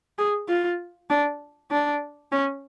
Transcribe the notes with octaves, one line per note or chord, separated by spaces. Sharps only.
G#4
F4
D4
D4
C#4